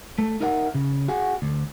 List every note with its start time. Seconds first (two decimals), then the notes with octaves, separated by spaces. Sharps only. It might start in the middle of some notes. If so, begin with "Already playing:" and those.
0.18 A3
0.40 D#4 A#4 E5 F#5
0.74 C#3
1.08 F#4 G#4 F#5
1.42 D2